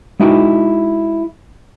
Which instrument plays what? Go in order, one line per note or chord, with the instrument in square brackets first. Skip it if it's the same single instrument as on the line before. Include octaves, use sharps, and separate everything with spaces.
[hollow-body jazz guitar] G#3 D#4 E4 F#4 G5